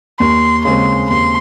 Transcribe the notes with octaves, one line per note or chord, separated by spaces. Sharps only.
D#2 C6
C#3 G#3 C4 C6
D#2 C6